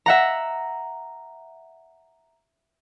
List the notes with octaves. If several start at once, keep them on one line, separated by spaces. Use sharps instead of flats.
E5 F#5 A#5